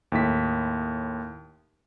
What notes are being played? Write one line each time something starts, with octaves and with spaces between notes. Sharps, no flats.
D#2 A2 B6